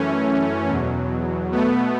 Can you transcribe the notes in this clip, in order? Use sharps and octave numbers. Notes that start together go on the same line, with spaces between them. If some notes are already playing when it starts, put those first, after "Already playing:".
Already playing: F#2 E3 A3 C#4
E2 B2 F#3
B2 A3 B3